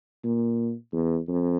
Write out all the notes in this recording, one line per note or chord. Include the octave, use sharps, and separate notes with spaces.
A#2
E2
F2